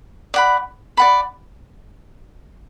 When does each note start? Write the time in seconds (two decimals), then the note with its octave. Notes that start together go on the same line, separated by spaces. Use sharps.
0.34 D5 F#5 B5
0.97 D5 F#5 B5